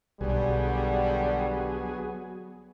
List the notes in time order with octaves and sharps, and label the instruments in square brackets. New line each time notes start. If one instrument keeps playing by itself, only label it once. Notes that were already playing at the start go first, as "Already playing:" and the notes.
[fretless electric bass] B1 [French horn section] D3 G3 [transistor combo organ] F#3 B3 G#4